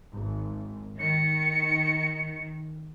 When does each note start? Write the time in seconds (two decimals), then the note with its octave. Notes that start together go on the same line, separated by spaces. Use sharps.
0.14 G#1
0.99 D#3 C#7